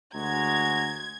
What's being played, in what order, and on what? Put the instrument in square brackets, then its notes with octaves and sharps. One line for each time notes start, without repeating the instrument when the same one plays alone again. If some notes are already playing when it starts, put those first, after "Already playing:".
[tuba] D2 [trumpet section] G#3 F#4 A#5 [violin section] G#6